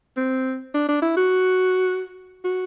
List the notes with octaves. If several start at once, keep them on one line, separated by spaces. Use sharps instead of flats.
C4
D4
D4
E4
F#4
F#4